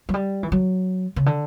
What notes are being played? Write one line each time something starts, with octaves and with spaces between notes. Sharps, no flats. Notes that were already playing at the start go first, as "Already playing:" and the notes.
F#3
G3
E3
F#3
C#3
D3